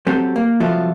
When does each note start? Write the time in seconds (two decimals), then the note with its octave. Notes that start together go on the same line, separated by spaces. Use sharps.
0.07 F#3 C4 G4 A4
0.36 A#3
0.60 C2 F3 F#3 F4 A4 E5